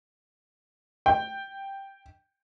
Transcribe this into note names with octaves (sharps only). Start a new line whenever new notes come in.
G5